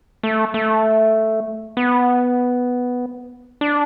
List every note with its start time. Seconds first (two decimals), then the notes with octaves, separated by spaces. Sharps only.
0.23 A3
0.54 A3
1.77 B3
3.61 D4